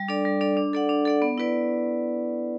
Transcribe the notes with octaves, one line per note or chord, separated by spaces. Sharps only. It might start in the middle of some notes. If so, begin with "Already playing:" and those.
Already playing: G3
D4 A4 D5
G3
D4 A4 D5
D4
A4 D5 F#5
D4
A4 D5 F#5
B3
E4 B4 D5